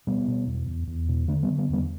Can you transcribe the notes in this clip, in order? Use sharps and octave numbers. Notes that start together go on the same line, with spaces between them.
B2 G3 B3
B2
E2
E2
E2
B2
D3 A3 D4
G3 B3
D3
G3 B3
E2 G3 B3